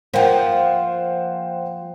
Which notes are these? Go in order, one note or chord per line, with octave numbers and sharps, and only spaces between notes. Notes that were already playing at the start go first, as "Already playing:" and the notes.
F3 A#3 C5 F#5 G5